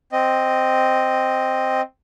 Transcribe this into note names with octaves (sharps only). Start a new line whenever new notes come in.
C4 D#5